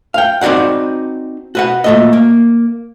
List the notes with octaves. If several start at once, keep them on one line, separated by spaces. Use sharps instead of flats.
F5 G5
C4 D#4 F#4 D5 F#5
F#4 B4 F#5
A#2 A3 D#5
A#3